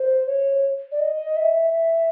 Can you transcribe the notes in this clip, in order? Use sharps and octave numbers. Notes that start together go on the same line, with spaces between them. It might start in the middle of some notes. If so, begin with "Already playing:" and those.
Already playing: C5
C#5
D5
D#5
E5